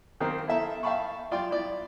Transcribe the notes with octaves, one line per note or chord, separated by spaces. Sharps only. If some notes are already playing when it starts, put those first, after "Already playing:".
D#3 A#3 C4
E4 A4 E5 A5 A#5
E5 F5 G5 A5 B5 C#6
F4 D5 G5 C6
E4 D5